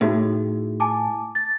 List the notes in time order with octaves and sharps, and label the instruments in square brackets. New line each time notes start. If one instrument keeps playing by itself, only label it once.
[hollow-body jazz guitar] A2 [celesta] D#4 F#4 G#4
[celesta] G#5 A5 D6
A6